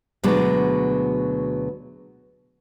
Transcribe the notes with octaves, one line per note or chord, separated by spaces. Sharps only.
D2 B2 F#3 G#3 D5